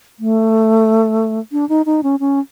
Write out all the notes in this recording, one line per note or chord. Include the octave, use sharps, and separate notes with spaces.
A3
D4
D#4
D#4
C#4
C#4